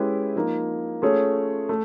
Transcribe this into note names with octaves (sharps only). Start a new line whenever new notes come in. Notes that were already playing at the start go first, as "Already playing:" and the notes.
Already playing: G#3 C#4 E4 G4 B4
F3 A#3 D#4
A3 C#4 F4 G#4 C#5
A3